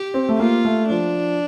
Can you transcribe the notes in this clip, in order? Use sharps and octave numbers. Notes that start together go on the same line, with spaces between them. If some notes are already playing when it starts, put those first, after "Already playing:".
Already playing: G4
C4
A3
A#3 F4
A3
F3 D4